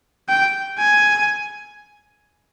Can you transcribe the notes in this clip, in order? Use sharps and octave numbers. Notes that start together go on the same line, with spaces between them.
G5
G#5